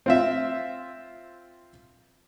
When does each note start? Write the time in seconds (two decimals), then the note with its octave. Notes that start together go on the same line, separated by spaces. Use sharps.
0.06 C4 F4 E5